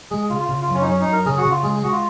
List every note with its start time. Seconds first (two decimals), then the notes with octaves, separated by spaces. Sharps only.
0.11 G#3 G#4
0.30 C#3 F4
0.40 F4
0.49 C#3
0.62 F4
0.68 F#2
0.74 C#4
0.82 D#4
0.87 F#3 C#4
1.00 D#4
1.07 F#2
1.13 A#4
1.26 C#3 G#4
1.37 F#4
1.45 C#3
1.51 F4
1.63 G#3 G#4
1.73 G#4
1.83 G#3 F#4
1.92 F4